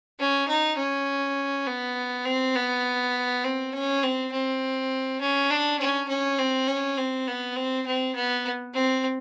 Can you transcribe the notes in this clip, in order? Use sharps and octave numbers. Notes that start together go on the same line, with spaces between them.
C#4
D#4
C#4
B3
C4
B3
C4
C#4
C4
C4
C#4
D4
C#4
C#4
C4
C#4
C4
B3
C4
C4
B3
C4